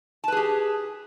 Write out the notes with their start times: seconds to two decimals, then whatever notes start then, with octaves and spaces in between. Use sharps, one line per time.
0.24 A5
0.28 B4
0.32 G#4
0.37 G4